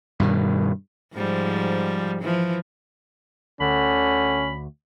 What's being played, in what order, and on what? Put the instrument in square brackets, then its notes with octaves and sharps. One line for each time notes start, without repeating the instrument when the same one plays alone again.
[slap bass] G2 B2 D#3
[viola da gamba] G#2 F3 G3
E3 F3
[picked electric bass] D2 [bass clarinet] D3 [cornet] C#4 [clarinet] B5